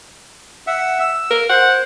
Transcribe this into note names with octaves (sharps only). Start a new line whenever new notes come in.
E5 F#5
E6
A#4
C5 F#5